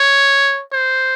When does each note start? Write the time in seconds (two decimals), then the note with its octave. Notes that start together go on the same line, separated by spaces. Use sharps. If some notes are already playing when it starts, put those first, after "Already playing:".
Already playing: C#5
0.72 C5